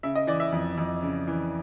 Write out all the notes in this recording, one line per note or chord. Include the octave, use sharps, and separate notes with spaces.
C#3 E5
D#5
E3 D5
E5
F2
F2
C#3
E3